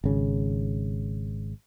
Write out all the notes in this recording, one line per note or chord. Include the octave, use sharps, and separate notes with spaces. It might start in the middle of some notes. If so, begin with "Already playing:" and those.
G#1 C#3